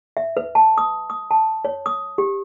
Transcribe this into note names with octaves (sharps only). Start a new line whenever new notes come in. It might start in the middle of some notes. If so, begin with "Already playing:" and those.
E5
B4
A5
D#6
D#6
A5
C#5
D#6
G4